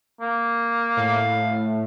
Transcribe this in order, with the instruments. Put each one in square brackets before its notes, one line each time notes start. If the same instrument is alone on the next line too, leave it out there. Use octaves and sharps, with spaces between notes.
[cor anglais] A#3
[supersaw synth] A2 [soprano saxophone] F5